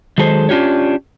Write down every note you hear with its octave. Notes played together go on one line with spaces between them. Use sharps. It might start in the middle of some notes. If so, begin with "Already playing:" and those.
D#3 F#3 G#3 A4 C5
C#4 D4 F4 G4 C#5